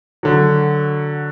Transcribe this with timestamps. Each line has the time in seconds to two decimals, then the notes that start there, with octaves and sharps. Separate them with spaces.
0.23 D3 F#3